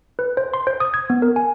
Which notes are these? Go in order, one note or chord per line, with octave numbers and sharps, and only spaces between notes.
B4
C5
C6
C5
D#6
G#6
B3
A#4
G#5